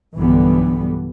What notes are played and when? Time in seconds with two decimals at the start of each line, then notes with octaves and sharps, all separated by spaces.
0.16 B1 G2 D3 E3 G3 B3